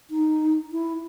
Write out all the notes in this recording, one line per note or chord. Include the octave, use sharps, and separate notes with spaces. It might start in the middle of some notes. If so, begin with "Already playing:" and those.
D#4
E4